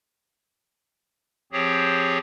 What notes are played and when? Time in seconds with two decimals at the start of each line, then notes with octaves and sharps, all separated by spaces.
1.52 F3 C4 G4 G#4 C#5